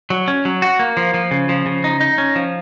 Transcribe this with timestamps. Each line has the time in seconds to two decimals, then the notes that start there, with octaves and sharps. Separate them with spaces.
0.10 F#3
0.28 C#4
0.45 F#3
0.62 F#4
0.79 A#3
0.97 F3
1.14 F3
1.31 C#3
1.49 F3
1.66 C#3
1.84 D#4
2.01 D#4
2.18 C#4
2.36 F3